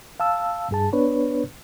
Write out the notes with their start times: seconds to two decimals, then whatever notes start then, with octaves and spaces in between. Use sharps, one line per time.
0.20 F5 A5 E6
0.71 G2 G#4 A5
0.93 B3 D4 B4 C#5